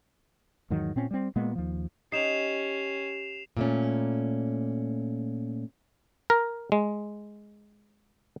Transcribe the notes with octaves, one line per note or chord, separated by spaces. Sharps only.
E2 G#2 D#3 F#3
A#2 C4 C#4
G3 C4
A#2 G#3 A#3 B3
D#2 F3
C#4 D#4 G4 C7 E7 F7
A#2 A3 C#4
A#4
G#3